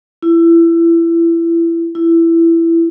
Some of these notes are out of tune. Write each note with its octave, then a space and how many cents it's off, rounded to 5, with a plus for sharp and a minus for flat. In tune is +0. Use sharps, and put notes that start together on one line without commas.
E4 +25
E4 +15